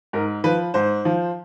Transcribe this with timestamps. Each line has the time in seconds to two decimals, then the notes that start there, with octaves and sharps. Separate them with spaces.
0.13 G#2 A#4
0.44 F3 B4
0.74 G#2 C5
1.05 F3